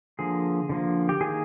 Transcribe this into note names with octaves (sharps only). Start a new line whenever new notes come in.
D3 F3 A#3 G#4
D3 F3 A#3
G4
D#3 A#3 G#4